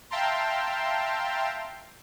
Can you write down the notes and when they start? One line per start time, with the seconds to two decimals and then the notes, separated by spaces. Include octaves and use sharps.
0.10 E5 F5 G5 A5 A#5 C6